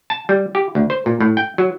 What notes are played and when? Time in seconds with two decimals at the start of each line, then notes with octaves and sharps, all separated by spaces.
0.10 A5
0.29 G3
0.55 G4
0.75 D2
0.90 C5
1.06 A#2
1.20 A2
1.37 G5
1.58 F#3